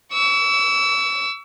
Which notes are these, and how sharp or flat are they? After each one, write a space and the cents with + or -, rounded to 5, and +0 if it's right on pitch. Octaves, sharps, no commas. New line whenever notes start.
C#6 +45 E6 +0